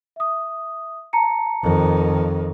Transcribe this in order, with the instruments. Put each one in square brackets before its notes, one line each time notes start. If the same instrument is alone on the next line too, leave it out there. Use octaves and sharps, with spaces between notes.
[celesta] E5 D#6
A5 A#5 C#7
[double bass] F2 D#3